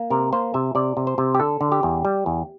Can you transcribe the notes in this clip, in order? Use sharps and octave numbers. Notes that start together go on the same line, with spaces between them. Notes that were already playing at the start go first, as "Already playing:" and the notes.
Already playing: A#3
C3 A#4
A#3 C5
C3 E5
C3 D5
C3
C5
C3
G4
D3 A4
D3
G4
E2
G3
E2